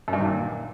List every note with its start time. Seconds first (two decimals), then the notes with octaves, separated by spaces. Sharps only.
0.08 F#2
0.13 G2
0.18 D#3
0.24 A#2